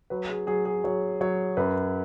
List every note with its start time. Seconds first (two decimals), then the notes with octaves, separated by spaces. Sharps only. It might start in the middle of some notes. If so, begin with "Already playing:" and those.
0.10 F#3 B4
0.29 G#4
0.47 F#3 G#4
0.65 G#4
0.84 F#3 C#5
1.21 F#3 C#5
1.57 F#2 B4